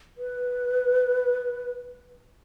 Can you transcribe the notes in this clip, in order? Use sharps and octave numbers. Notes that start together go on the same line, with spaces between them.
B4